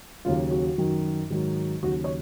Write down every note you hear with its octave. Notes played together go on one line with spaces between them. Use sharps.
D#2 C#3 F#3 F4
F#4
F#2 D#3 F#3
G#2 D#3 F#3
D#2 C#3 F#3 F#4
C#5